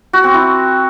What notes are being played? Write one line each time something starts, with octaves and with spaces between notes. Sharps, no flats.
F#4
C4
E4